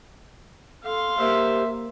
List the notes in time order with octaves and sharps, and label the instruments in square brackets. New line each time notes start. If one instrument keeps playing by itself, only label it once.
[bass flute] A4 [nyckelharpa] F5 C6
[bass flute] A#3 [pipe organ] G4 C5 [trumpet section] E5